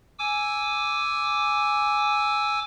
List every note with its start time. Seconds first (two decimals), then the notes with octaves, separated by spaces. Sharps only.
0.19 G#5 D6 E6